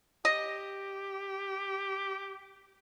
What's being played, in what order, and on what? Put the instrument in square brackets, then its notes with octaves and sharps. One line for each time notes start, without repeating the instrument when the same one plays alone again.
[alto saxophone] G4 [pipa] D#5